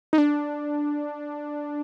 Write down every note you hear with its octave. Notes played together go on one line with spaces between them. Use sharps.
D#4
D4